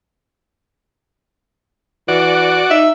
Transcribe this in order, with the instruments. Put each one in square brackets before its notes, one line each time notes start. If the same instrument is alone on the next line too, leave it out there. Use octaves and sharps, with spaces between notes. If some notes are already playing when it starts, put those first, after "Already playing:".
[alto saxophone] E3 [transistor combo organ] F#4 D5
[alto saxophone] D#4 [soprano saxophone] E5